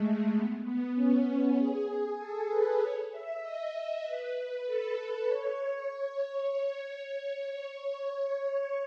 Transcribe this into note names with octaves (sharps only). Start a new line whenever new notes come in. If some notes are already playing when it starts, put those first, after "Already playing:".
Already playing: G#3 A3
B3
B3
C#4
G#4
A4
B4
C#5
E5
D#5
B4
A4
C#5